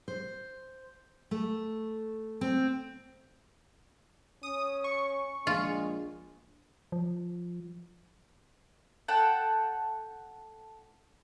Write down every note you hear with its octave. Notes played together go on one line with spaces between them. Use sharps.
C5
A3
C4
C#4 D#6
C#6
A#1 G#3 F4
F3
A4 F#5 G5 A5